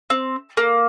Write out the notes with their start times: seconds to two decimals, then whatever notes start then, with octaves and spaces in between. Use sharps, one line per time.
0.10 C4
0.57 A#3